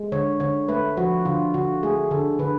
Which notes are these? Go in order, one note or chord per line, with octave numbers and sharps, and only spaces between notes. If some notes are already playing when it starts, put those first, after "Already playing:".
Already playing: G#3
D3 C#5
D3 C#5
A3 B4
F3 F#4
D3 F4
D3 F#4
A3 G#4
D3 A4
D3 B4